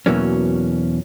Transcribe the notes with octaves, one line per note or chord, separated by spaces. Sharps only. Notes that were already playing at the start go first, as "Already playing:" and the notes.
E2 B2 E3 F#3 A#3 C#4